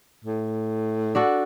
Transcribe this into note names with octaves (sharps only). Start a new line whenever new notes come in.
A2
D4 F#4 A4